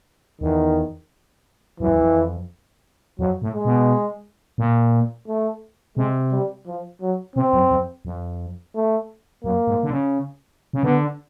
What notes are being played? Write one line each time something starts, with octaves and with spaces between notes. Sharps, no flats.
E2 D#3
F#2 E3
F2
E2
F2
F2 F#3
A2
G#3
B2
A#2
A3
C3 G#3
G3
F3
F#3
C3 C4
F#2
F2
F2
A3
F#2 A#3
G#2
D3
C#3
C#3
D3 B3